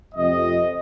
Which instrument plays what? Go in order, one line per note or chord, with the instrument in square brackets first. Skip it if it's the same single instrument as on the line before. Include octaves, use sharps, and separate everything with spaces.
[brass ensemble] F2 C3 F3 A3 C4 D#5